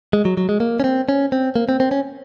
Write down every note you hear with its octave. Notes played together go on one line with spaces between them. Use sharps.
G#3
F#3
F#3
G#3
A#3
C#4
C4
C#4
C4
A#3
C4
C4
C#4